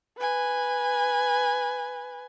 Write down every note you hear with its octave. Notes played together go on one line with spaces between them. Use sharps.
B4 G#5